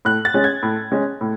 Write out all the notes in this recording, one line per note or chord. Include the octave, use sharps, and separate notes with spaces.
A2 F#6
A6
G#3 C#4
G#6
A2
G#3 C#4
A2